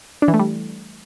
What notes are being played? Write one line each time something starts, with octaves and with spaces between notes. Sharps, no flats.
D4
E3
A3
G3